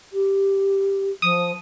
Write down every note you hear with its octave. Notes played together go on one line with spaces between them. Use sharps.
G4
F3 D#6